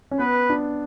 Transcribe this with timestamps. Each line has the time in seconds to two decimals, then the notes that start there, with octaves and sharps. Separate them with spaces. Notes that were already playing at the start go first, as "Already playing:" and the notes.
0.11 C#4
0.19 B3 B4
0.50 D4